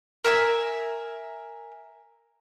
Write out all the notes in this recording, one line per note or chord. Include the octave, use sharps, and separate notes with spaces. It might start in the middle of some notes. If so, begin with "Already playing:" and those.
A#4 E5 G#5 E6